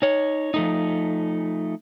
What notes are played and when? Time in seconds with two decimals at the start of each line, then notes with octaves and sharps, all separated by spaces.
0.02 D#4 C#5
0.54 F3 A3 D#4